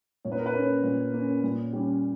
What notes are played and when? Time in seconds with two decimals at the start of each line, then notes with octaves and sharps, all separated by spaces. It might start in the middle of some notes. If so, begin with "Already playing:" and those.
0.25 A#2 C#5
0.32 B4
0.39 A#4
0.46 B4
0.54 A#3 C#4 C#5
0.83 A#2
1.14 A#3 C#4
1.43 A#2
1.73 G3 C#4